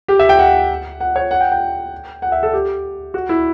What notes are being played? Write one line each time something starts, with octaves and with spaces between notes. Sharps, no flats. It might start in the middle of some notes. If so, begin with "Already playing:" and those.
G4
E5
G5
F#5
F#5
C#5
F#5
G5
G5
F#5
E5
A4
G4
F#4
E4